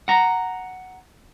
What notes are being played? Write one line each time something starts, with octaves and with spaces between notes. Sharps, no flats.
F#5 A#5